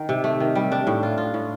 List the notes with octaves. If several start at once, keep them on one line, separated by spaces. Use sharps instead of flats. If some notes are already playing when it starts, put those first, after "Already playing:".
Already playing: D#3
C3
A3
D#3
G3
D4
A2
F4
F4
A2